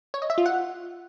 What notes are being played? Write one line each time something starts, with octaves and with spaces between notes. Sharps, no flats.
C#5
D#5
E5
F4
F#5